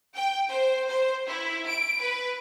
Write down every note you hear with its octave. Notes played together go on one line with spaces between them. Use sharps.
G5
C5
C5
E4
D7
B4